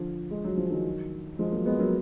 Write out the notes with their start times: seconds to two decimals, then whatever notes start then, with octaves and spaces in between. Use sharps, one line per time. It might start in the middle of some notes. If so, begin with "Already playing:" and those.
Already playing: D3 F3
0.31 G#3
0.44 F#3
0.57 F3
0.71 D#3 F#3
1.39 F3 G#3
1.52 F#3 A#3
1.66 G#3 B3
1.79 F#3 A#3